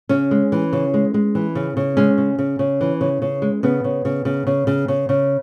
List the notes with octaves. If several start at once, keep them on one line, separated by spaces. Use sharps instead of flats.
C#3 C#4
G#3
E3
C#3
G#3
G#3
E3
C#3
C#3
G#3 C#4
C#3
C#3
C#3
E3
C#3
C#3
G#3
C#3 B3
C#3
C#3
C#3
C#3
C#3
C#3
C#3